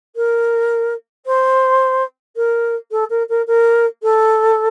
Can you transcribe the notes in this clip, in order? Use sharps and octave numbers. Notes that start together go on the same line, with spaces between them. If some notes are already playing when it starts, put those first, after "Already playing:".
A#4
C5
A#4
A4
A#4
A#4
A#4
A4